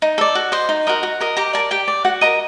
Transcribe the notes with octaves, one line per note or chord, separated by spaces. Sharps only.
D#4
A4 D5
F#4
C5 D#5
D#4
F#4 A#4 D#5
F#4
A#4 D#5
G4 A#5
A#4 D5 A5
G4 G5
D5
F#4 F#5
A#4 D#5 A#5